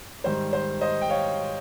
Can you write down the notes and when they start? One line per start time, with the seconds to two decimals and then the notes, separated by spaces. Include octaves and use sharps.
0.24 G#2 D#3 G3 C5
0.53 C5
0.81 C5 D#5
1.01 G5
1.09 C#5 F5